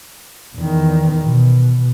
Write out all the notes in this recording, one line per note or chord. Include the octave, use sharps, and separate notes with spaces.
E2 D#3
B2